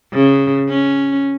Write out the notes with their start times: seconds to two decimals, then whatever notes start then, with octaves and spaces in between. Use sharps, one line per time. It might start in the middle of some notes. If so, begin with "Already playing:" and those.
0.13 C#3
0.69 C#4